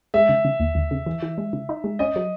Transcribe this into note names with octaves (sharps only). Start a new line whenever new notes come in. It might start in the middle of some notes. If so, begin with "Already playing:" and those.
G#3 E5
C#3
C#3
D#2
D#2
C#3
E3
E3
G#3
C#3
D#4
G#3
C#4 D#5
F#3